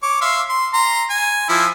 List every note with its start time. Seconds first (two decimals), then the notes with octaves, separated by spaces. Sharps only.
0.03 C#5 D6
0.21 E5 F5 C6
0.49 C6
0.73 A#5 C6
1.10 G#5
1.49 F3 E4